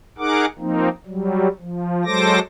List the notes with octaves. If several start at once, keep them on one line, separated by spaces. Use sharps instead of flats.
D#4 G#4 A#4 F#5 D6
F3 A#3 C4 D#4
F#3 G3
F3
F#3 G#3 A4 C5 D6 A#6